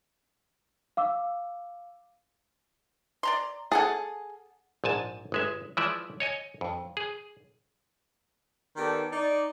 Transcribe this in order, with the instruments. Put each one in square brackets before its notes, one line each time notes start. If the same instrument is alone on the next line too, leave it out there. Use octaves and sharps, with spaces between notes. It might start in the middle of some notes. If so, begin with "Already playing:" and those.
[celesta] F5 D6 E6
[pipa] D5 A#5 C6
[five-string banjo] G#4 G#5 [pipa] A4 F#5 A5
[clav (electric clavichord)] A#1 G#2 G#5 A5
G1 G#3 E5
E3 F3 G#3 D5 E5
C#5 D#5 G#5
F2
G#4
[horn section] D#3 B3 G4 A4 D5
D#4 D5